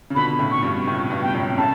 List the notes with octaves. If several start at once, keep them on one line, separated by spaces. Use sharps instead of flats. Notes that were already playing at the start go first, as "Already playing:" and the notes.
C#3
B2 D3 B5
A2 C#3
C#6
G2 B2
A2 C#3 C#6
G2 B2
G5
F#2 A2
A2 C#3 A5